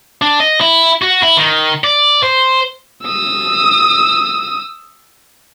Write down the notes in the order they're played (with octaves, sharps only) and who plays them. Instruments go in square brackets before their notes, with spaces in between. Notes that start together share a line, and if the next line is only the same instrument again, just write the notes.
[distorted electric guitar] D4
D#5
E4
F#4
E4
D#3
D5
C5
[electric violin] D#6 E6